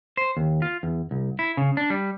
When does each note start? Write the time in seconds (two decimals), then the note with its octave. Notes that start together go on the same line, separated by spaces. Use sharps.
0.17 C5
0.37 D#2
0.62 F4
0.83 E2
1.11 C2
1.39 E4
1.57 C#3
1.77 D4
1.90 G3